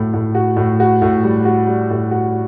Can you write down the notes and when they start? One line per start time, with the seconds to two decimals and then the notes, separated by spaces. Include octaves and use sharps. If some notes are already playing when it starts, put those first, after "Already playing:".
Already playing: A2 F#4
0.14 A2
0.35 F#4
0.57 A2
0.80 F#4
1.02 A2
1.23 G3
1.45 F#4
1.67 G3
1.90 A2
2.11 F#4